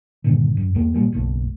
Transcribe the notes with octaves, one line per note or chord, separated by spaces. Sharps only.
G2 A#2 D3 D#3
F#2
E2 G#3 A#3
A#2 F#3 G3 A#3
F#1 B1 A2 A3